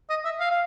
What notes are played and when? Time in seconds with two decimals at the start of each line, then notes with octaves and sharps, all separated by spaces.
0.10 D#5
0.25 E5
0.40 F5
0.51 F5